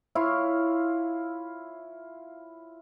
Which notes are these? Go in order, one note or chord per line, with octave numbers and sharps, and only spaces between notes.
E4 F4 C#5 F5